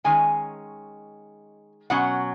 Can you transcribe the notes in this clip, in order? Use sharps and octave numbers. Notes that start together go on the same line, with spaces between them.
D#3 G#3 C#4 G#5
B2 F#3 C#4 F#5